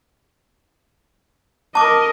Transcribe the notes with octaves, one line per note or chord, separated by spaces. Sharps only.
A#4 D#5 A5 D6